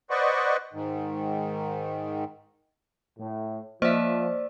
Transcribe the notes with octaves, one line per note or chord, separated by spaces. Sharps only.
B4 C5 D5 D#5 F#5 C#6
G#2 D#3
A2
F3 A#3 C5 D5 E5